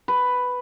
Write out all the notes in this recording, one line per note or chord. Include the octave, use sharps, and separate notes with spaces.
B4